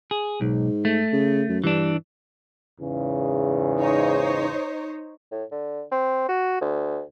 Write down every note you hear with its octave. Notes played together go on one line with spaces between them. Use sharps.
G#4
B1 G#2
A3
C#3
F#2
G2 E3 D4
E2 G#2 C#3
D#4 C5 C#5
A2
D3
C4
F#4
D2